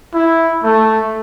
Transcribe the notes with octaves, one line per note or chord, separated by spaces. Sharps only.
E4
A3